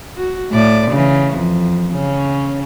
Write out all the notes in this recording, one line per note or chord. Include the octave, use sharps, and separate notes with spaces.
F#4
A2 D5
C#3 E3
F2
C#3 C#4